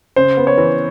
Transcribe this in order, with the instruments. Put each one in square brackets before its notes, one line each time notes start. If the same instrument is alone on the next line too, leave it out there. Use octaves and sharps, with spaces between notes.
[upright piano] C#3 [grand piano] C5
[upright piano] B3
[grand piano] C#5
[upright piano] E3